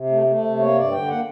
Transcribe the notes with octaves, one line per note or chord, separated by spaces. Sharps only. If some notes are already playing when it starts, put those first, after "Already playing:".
Already playing: C3
A3
A3
C3
A#3 C#5
G2 D5
D3 G5
A#3 F#5